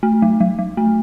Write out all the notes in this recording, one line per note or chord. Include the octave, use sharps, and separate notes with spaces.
A3
F#3
F#3
F#3
A3